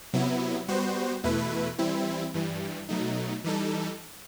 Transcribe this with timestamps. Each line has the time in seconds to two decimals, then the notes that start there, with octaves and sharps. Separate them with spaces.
0.13 C3 F#3 B3 E4
0.68 G3 B3 F#4 C5
1.24 E2 B2 A3 E4 B4
1.78 E3 G3 C4 E4
2.34 G2 E3 G3
2.89 B2 F#3 A3 D#4
3.44 E3 G3 D#4 A4